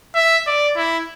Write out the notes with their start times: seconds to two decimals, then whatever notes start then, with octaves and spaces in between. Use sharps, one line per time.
0.15 E5
0.47 D5
0.76 E4